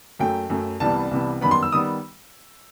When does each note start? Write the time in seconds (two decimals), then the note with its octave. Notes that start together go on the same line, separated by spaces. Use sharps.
0.19 F#2 F#3 A3 G5
0.50 F#2 F#3 A3
0.80 C2 C3 E3 G3 B3 A5
1.11 C2 C3 E3 G3 B3
1.41 F#2 D#3 G3 B3 B5
1.51 C6
1.63 E6
1.72 D#3 G3 B3 D#6